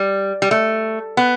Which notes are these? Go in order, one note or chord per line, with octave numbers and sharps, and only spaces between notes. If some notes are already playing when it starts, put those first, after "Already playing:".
Already playing: G3
G3
A3
B3